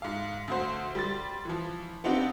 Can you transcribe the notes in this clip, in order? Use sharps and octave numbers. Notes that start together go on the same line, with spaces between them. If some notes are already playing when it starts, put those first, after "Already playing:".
G#2 F5
D2 F#4 C5
G3 C6 A6
E3 F3
B3 C4 D4 D#4 F4 G4